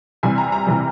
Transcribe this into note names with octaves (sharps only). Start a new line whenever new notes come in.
C3 E3 G3 G#5
A#5
A#5
C3 E3 G3